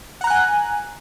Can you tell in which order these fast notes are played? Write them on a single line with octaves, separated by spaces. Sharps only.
F#5 A#5 F#6 G#5